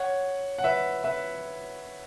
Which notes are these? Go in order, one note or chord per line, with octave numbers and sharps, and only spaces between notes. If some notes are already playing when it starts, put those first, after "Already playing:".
Already playing: C#5 F#5
F#5
B4 E5
B4 E5